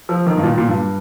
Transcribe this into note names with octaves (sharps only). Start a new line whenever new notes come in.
F3
D#3
G2
A#2
A#2
G2